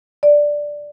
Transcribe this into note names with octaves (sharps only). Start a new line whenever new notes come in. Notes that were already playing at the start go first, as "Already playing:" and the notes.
D5